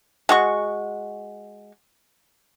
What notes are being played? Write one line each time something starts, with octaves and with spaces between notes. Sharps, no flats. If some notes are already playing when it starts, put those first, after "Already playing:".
G#3 F#4 C#6